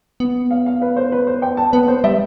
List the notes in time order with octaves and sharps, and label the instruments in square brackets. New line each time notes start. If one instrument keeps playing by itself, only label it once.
[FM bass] B3
[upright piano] F5
F5
B4
C5
B4
C5
G5
A5
[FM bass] B3 [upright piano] B4
[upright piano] C5
[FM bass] G3 [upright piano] E5